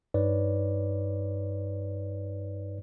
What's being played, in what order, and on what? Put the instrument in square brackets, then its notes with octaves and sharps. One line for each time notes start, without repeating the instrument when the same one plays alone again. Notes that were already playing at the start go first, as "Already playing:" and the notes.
[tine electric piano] G2 D#4 B4 C#5 D5